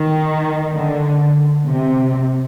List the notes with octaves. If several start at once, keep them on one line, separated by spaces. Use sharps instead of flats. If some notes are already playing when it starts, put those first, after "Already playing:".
Already playing: D#3
D3
C3